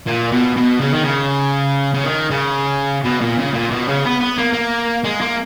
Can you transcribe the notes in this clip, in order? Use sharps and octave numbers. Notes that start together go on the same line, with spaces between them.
A#2
B2
B2
C#3
D#3
C#3
C#3
D#3
C#3
B2
A#2
C#3
A#2
B2
C#3
B3
B3
A#3
A#3
G#3
A#3